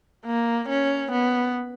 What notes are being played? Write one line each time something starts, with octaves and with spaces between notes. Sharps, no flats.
A#3
C#4
B3